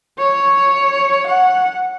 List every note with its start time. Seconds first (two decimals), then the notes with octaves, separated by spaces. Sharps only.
0.18 C#5
1.26 F#5